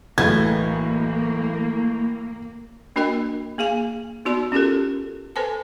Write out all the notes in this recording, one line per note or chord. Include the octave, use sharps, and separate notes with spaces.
B1 A2 E3 A#3 G#6
A#3 D4 F#4 A#4 D#5 G5
A#3 G#4 F5 G#5
B3 D#4 F#4 D5 C6
C#4 F4 G4 A4 A#4
A4 B4 C5 G#5 A5